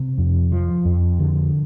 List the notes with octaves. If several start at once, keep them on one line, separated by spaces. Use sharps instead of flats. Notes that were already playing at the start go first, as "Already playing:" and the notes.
Already playing: C3
F2
F3
F2
D3